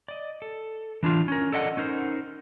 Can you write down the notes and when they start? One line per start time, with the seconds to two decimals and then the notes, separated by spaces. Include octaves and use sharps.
0.08 D5 D#5
0.42 A4
1.03 E3 D4 E4 F4
1.28 C#4 A#4
1.52 A4 D5 D#5 F#5
1.77 C#4 D#4 A#4 C5